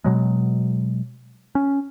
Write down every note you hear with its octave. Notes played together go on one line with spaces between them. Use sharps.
B2 F#3 G#3
C#4